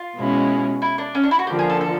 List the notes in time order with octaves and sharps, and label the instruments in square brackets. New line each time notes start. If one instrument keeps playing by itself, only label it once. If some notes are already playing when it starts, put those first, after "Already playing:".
Already playing: [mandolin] F4
[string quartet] B2 G#3 C#4 E4
[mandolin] E4
D4
C#4
D4
E4
F#4
[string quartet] D3 F3 A#3 [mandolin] G4
[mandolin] G#4
A4
A4